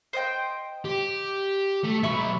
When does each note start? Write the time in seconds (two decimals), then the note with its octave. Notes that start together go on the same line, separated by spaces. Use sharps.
0.13 C5 D#5 G5
0.85 G4
1.84 A3
2.03 B2 F#3 E5 B5 C#6